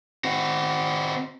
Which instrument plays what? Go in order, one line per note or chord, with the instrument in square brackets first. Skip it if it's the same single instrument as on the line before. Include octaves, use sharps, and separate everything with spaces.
[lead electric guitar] C4 F#4